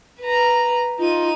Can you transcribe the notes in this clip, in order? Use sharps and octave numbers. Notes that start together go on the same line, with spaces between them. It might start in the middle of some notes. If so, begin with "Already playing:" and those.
B4 A#5
D#4 F4 D#7